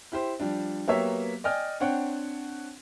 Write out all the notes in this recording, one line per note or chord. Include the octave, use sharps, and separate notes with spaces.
E4 G4 C5
F3 G3 D4
F#3 A#3 B3 G4 C#5 E5
D5 D#5 G5 G#5 F6
C4 D4 C#5 F#5 G5